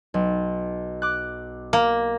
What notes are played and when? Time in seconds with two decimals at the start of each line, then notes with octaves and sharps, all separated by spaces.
0.14 B1
1.02 D6 F#6
1.73 A#3